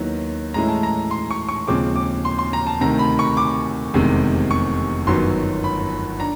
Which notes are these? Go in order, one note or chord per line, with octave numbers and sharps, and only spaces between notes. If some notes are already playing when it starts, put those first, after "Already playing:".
Already playing: D#2 D#3 F#3 B3 E4
A2 E3 G#3 C#4 E4 A#5
A5
A#5
C6
C#6
C#6
D#2 C#3 F3 G#3 C4 D6
D6
C6
C6
A#5
A5
D2 C3 D#3 A#5
B5
C#6
D6
F1 E2 C3 D#3 G#3
C#6
G1 F#2 D#3 F#3 B3 C6
B5
D4 A#5